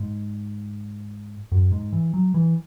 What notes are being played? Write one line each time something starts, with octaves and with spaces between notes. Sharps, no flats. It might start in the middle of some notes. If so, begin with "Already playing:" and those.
Already playing: G#2
F#2
G#2
E3
F#3
E3